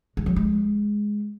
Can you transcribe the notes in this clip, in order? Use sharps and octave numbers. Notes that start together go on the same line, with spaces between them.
G#3
F#3
G#3